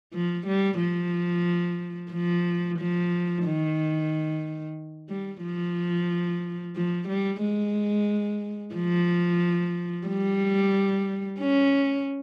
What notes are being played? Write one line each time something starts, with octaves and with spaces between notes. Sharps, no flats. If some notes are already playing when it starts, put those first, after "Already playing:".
F3
G3
F3
F3
F3
D#3
G3
F3
F3
G3
G#3
F3
G3
C#4